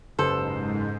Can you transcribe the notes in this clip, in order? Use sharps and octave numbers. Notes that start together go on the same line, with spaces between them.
F#1 G#2 G4 A4 B4 C5